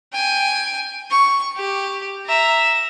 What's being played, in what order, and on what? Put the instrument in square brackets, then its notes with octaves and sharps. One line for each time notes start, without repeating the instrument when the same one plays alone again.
[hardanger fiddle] G5 G#5
C#6
G4
E5 A#5